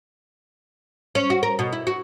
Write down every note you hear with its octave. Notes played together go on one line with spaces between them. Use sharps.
C#4
F#4
A#4
B2
E4
F#4